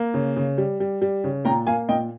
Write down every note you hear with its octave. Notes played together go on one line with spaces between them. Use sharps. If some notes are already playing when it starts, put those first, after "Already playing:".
Already playing: A#3
C#3
C#3
G3
G3
G3
C#3
A#2 G5 A#5
A#3 F5 G#5
A#2 D#5 G5